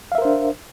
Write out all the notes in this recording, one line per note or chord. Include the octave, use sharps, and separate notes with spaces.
D4 A#4 C5 E5 F5